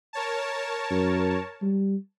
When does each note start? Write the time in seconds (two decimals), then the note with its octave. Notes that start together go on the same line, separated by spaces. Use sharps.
0.13 A#4 C#5 A5
0.91 F#2
1.62 G3